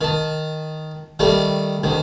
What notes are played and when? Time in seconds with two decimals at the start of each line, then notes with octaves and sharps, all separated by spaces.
0.01 D#3 A5
1.19 D#3 G3 A3
1.83 D2 D#3